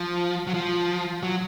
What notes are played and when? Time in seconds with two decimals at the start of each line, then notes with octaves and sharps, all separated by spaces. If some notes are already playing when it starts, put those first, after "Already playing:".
Already playing: F3
0.47 F#3
0.54 F3
1.23 F#3